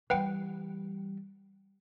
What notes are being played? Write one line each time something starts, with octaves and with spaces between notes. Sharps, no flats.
E3 G3 B4 F#5 G5